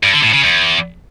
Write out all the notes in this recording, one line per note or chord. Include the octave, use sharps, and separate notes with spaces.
G2
D3
A2
C#3
E2